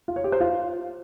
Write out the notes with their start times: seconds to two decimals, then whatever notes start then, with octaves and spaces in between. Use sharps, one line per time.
0.08 F4
0.16 C#5
0.24 G4
0.32 C5
0.40 F4